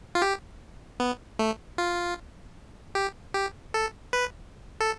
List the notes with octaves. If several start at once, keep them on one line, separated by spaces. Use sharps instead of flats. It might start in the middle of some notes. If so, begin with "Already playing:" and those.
F4
G4
B3
A3
F4
G4
G4
A4
B4
A4